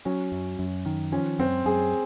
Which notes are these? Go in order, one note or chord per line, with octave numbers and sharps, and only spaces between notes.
F#3 C#4
F#2
F#2
D#3
F3 C#4
F#2 C4
F#2 G#4